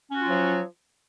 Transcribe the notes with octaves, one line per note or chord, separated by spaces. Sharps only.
F3 F#3 C#4 F4 F#4